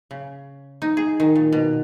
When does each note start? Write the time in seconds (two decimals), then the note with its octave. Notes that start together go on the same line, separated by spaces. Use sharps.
0.11 C#3
0.82 D#4
0.97 G#4
1.20 D#3
1.36 A#2
1.52 B2